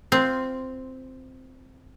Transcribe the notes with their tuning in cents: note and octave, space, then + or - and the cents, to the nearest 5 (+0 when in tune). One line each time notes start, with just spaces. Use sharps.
C4 -5 F4 +0